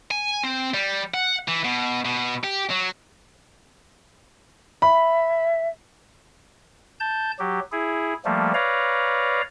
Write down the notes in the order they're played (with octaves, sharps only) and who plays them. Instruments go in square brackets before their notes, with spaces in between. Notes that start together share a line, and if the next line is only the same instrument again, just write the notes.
[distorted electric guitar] G#5
C4
G3
F#5
E3
B2
B2
G4
F#3
[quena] E5 [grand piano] B5
[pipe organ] A5 G6
F#3 G4
E4 G#4
F3 G3 A3 A#3
B4 C#5 D5 F5 A#5